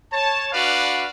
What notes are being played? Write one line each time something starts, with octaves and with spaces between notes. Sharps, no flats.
C#5 A5
D4 F#4 B4 D5 F5